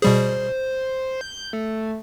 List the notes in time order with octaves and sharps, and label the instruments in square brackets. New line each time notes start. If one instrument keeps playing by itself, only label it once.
[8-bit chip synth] B2 G3 G#4 [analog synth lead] C5
[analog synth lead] G6
A3